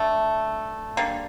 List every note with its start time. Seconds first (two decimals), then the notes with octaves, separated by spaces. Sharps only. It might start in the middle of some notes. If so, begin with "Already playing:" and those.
Already playing: D3 A3
0.97 D3 G3 A#3